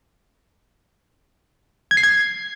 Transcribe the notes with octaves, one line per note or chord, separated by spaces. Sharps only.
G#6
C7
G#6